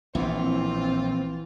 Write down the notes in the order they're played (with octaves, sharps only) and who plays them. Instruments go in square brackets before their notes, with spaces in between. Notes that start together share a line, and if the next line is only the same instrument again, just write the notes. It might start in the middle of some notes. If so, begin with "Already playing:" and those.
[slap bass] A#1 A2 [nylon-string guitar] E3 B3 E4 [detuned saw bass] C4 [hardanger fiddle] F4